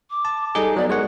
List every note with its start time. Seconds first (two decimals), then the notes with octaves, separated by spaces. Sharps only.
0.10 D6
0.25 A5
0.55 G3 D#4 G#4 A4
0.76 F#3 B3 D5
0.90 G#3 A#4 C#5 F#5